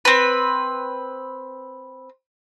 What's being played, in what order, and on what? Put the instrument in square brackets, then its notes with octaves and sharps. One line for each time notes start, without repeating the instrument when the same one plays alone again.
[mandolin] C4 B4